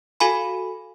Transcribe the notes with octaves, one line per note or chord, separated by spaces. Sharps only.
F#4 A4 F5 G#5 B5